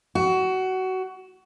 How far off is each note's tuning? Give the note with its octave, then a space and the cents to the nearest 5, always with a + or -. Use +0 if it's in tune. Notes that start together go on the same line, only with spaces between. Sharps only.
F#4 +20